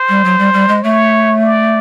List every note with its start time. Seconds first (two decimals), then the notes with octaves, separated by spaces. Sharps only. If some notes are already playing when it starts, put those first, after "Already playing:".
Already playing: C5
0.09 G3
0.25 F#3
0.39 G3
0.53 G3
0.68 G#3
0.83 A3 C#5
1.43 D5